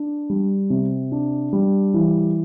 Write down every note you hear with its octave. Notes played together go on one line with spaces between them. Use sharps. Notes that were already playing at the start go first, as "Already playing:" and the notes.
Already playing: D4
G3
C3
D4
G3
E3